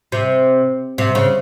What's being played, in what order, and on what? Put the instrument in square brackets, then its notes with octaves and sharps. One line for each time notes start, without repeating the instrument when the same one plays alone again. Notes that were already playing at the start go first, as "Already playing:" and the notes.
[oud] C3
C3
C#3